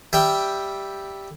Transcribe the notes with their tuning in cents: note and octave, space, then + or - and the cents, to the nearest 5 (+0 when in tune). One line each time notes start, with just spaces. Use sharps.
G3 +0 E5 +0 G5 +0